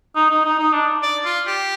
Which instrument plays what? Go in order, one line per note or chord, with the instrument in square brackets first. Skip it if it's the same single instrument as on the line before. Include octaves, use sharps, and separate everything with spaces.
[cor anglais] D#4
D#4
D#4
D#4
D4
[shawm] D5
F4
G4